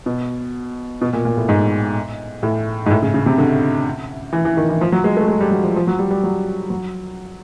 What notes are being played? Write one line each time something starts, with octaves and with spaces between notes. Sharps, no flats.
B2
B2
A#2
A#2
A2
G#2
A2
G#2
A2
C#3
C#3
C3
D3
E3
E3
D#3
E3
F3
F#3
G#3
A3
G#3
G3
F#3
F3
F3
F#3
G3
G3
F#3
F#3